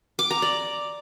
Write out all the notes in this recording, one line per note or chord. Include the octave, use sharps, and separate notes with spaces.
D6
A#5
D5